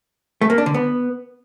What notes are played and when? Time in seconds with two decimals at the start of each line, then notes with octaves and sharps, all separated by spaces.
0.41 A3
0.50 A#3
0.58 D4
0.66 D3
0.74 B3